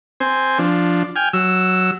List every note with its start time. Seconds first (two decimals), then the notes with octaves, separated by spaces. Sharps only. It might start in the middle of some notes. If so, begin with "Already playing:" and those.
0.20 C4 C5 G#5
0.59 F3 D4
1.16 G5 G#5 F6
1.33 F#3 E6